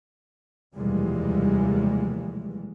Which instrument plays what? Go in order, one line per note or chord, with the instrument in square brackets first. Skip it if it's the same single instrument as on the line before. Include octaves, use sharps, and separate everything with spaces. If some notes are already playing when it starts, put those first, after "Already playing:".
[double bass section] F1 D#2 B2 E3 G3 G#3